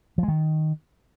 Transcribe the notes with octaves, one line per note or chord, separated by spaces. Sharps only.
F3
G#3
D#3